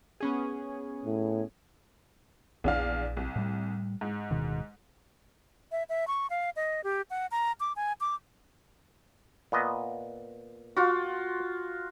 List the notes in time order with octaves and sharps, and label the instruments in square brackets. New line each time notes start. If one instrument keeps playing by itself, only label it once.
[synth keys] B3 C#4 G#4
[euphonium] A2
[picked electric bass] A#1 [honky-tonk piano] E2 D4 F5
[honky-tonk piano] C2
[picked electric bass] A2 G3
[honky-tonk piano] G#2
[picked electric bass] D1 B2 D#3
[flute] E5
E5
C#6
F5
D#5
G4
F#5
A#5
D6
G#5
D6
[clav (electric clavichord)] A#2 B3 D#5
[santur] F4 F#4